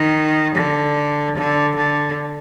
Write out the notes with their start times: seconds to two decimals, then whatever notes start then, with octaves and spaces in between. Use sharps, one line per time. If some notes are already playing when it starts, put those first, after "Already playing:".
Already playing: D#3
0.55 D3
1.36 D3
1.76 D3